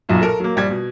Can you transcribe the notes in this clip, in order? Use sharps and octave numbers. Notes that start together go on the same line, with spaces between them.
B1 F#2 A#2
A4 A#4
F#3 A#3
A#1 G3 G#6
B2